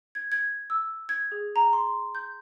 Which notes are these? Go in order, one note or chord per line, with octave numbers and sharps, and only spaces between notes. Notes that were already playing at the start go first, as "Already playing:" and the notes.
G#6
G#6
E6
G#6
G#4
A#5
C6
G6